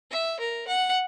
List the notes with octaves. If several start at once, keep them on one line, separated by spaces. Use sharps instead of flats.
E5
A#4
F#5